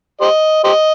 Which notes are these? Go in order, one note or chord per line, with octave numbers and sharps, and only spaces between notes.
G4 C5 D#5
G4 C5 D#5